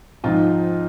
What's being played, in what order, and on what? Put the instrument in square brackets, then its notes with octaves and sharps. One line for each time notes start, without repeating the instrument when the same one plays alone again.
[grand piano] G#2 F3 C4 D#4 F4